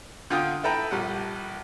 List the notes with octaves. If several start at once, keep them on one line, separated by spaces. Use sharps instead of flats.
D3 F4 G5 D#6
E4 A4 B4 G5 A#5
A#1 G3 F#5